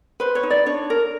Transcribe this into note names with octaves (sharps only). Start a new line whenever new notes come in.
B4 C5
C#5
D#4
D5
D4 C#5
A#4